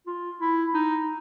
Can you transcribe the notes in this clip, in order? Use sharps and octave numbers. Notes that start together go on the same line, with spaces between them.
F4
E4
D#4